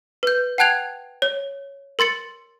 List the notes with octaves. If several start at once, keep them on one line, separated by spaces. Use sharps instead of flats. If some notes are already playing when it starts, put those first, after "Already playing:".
B4 G6
F#5 G5 A5 F#6 G#6 F7
C#5
A#4 C6 A6 C#7